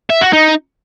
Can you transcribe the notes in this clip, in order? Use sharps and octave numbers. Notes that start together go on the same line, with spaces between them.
E5
F#4
D#4